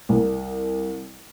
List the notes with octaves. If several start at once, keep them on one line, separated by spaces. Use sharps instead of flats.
C2